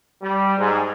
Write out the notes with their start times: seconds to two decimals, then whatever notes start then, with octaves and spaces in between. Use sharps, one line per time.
0.22 G3
0.58 G#2